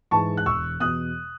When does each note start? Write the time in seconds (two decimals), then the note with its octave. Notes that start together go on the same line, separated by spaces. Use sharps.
0.11 G#2 E3 G#3 A5 C#6
0.37 F#6
0.46 E1 C#6 E6
0.80 E2 B2 D#6 F#6